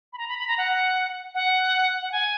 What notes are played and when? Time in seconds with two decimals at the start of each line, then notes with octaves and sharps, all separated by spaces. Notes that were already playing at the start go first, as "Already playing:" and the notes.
0.13 B5
0.18 A#5
0.28 B5
0.39 B5
0.48 A#5
0.58 F#5
1.35 F#5
2.03 F#5
2.12 G#5